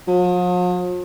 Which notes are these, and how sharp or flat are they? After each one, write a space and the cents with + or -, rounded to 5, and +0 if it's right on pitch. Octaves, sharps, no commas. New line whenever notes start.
F3 +45